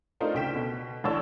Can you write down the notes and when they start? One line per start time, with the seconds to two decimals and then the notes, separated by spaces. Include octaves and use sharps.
0.20 A3 D4 D#4 F4 A#4 C5
0.34 D2 C#3 C#4 G5 B6 E7
0.55 B2
1.04 A1 D2 D4 C#5 A5 E6